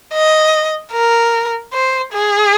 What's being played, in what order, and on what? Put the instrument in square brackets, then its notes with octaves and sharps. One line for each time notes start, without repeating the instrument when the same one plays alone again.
[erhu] D#5
A#4
C5
G#4